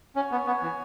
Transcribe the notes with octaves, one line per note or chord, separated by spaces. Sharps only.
C#4 F#4 C#5 G#5
B3
B3
E3